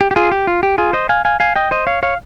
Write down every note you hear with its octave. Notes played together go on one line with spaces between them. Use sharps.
G4
G4
F4 G#4
G4
F4
G4
F4 G#4
C5 D#5
F5 G#5
F5 G#5
F5 G#5
D#5 G5
C5 D#5
C#5 F5
C#5 F5